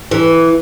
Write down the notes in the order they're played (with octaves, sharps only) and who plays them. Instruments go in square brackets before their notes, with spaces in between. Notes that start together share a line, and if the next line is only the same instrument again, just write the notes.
[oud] E3